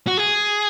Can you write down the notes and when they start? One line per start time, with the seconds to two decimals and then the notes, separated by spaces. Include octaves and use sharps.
0.07 F#4
0.17 G#4